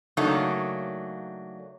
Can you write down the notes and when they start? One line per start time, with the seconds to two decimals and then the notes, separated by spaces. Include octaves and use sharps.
0.17 C#3 F#3 A3 A#3 D4 D#4